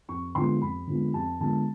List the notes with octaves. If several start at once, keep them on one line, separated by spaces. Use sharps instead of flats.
F2 C#6
D3 F3 G#3 B3 C6
F2 B5
D3 F3 G#3 B3
F2 A5
D3 F3 G#3 B3 A5